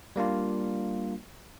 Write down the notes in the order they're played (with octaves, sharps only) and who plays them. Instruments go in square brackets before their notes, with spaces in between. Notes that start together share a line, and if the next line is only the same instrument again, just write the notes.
[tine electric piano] G3 A#3 D4 F4